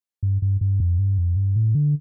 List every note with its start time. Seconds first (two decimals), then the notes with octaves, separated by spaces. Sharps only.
0.23 G2
0.42 G2
0.61 G2
0.80 F2
0.99 G2
1.18 F2
1.36 G2
1.56 A2
1.75 D3